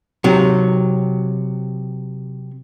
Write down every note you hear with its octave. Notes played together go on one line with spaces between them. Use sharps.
C3 F#3